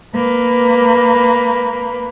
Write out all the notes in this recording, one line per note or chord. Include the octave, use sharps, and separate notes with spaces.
A#3 B4